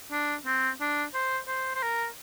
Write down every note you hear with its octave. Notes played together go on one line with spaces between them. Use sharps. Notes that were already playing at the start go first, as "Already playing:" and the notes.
D4
C4
D4
C5
C5
C5
A#4